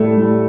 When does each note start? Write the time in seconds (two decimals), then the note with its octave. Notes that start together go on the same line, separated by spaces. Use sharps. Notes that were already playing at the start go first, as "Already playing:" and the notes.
Already playing: A2 G3 A3 A4
0.16 A2 G3